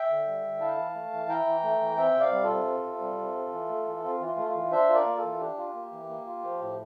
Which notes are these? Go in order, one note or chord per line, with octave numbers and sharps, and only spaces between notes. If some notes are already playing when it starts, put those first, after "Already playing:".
Already playing: E5 G5
D3
G3
D3
E4 F5 A5
E3
A3
E3
E4 G5 A#5
E3
A3
E3
C4 E5 G5
C3
D5 F5
G3
F4 A4
C3
C4
C3
G3
C3
C4
E3
A3
E3
C4 F4
E3
F4
A3
F4
E3
D4 C5 E5
F4
A#4 D5
A#3
F4 A4
E3
D4 G4
F4
A#3
E3
A#3
F4
F3
A2